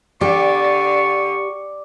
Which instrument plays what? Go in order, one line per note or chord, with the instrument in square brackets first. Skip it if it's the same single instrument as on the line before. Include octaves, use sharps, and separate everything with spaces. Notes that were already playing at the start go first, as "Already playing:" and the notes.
[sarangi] D3 [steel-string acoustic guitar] G4 [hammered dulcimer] D5 [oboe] C#6